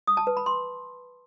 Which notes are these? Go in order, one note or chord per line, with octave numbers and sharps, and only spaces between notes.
D#6
A5
B4
B5
C6